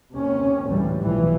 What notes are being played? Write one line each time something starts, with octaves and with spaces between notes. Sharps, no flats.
D#2 C3 C#4
D2 A2 E3 G3
B1 A2 E3 F3